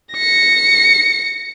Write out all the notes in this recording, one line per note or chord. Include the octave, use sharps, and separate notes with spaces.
A#6 C#7